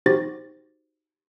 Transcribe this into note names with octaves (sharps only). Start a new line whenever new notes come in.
D#4 F#4 G4 C5 A6 A#6